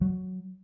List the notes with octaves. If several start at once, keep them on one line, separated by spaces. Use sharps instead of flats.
F#3